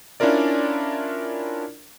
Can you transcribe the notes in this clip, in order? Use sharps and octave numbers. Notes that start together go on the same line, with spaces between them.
C#4 D4 E4 F4 A#4 D5